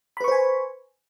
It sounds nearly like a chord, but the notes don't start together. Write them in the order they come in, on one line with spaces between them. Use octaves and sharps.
B5 B4 C#6 C5 G#5